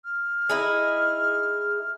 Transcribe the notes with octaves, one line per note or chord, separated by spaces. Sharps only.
F6
D#4 E4 G#4